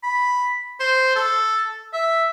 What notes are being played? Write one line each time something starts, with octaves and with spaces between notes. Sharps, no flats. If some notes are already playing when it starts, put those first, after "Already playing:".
B5
C5
A4
E5